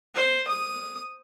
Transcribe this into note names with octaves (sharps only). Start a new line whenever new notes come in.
C5
D#6